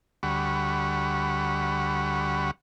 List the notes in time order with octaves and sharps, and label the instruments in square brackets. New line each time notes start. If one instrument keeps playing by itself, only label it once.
[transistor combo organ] D2 G3 F#5 B5 C#6